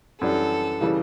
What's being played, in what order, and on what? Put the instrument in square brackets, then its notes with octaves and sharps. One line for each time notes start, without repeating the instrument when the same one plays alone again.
[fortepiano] F#2 E3 G3 D4 [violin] A4
[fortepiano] C#3 E3 G3